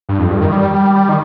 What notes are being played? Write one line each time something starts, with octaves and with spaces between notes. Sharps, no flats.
G2
F2
G2
D#3
G3
G3
G3
D#3